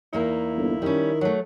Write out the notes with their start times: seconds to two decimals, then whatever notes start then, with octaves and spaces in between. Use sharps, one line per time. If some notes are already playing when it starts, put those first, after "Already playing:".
0.13 E2 A#3 D#4 E4
0.56 G1
0.82 D#3 G3 C#4
1.21 F#3 A3 F#4